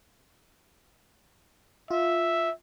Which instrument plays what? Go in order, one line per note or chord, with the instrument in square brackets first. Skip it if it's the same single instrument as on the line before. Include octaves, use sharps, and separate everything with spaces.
[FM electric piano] F4 [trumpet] E5